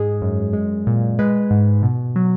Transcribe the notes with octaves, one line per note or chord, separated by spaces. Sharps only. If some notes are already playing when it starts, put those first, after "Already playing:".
Already playing: G#2 G#3 G#4
F#2
G#3
A#2
G#3 B4
G#2
B2
F#3